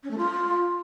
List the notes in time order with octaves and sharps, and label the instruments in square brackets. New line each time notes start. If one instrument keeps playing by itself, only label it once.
[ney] C#4
A3
F4